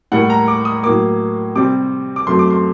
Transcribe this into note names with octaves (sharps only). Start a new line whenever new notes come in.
A2 G3 A#3 F#5
A#5
D6
D#6
A2 F#3 A#3 D6
C3 G3 C4 D6
D6
F#2 F#3 A3 C4 C6
D6
C6